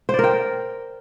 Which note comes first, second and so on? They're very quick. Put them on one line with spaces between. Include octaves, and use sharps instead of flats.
C5 D5 A#4 G5